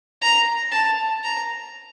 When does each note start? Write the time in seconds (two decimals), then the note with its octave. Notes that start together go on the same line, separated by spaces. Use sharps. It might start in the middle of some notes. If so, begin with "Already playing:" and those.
0.22 A#5
0.71 A5
1.23 A#5